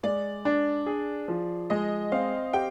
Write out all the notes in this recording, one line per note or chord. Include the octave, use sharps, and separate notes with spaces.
G#3 D5
D4
G#4
F3
G#3 D#5
C4 F5
G4 G5